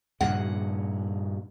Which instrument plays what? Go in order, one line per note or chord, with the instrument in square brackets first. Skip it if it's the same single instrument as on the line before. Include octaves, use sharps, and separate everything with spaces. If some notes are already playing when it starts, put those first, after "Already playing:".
[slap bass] G2 A#2 C#3 [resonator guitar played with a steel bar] F#5